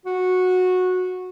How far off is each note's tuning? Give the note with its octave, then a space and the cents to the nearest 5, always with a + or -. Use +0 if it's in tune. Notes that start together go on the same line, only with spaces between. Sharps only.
F#4 -15